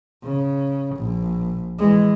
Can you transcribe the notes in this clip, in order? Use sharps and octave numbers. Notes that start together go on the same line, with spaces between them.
C#3
A#1
E3 G#3